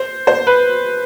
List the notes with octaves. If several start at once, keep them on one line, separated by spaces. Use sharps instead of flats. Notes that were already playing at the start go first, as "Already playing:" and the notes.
Already playing: C5
C5
B4